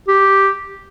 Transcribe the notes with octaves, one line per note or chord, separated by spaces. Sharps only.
G4